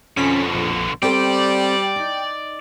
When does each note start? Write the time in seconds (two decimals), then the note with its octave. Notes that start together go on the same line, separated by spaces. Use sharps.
0.17 F2 B2 D3 C#4 B6
0.54 A#1
1.02 G3 C4 A4 C5 D5 G5
1.96 D#4